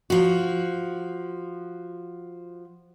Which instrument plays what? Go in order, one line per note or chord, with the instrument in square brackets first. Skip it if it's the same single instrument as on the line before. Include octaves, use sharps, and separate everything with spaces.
[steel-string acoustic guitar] F3 F#4